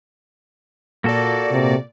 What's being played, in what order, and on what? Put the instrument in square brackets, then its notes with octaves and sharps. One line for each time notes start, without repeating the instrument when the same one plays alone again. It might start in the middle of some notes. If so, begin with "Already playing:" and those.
[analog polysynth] A#2 D5 [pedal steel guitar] A#3 F#4 A4
[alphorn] C3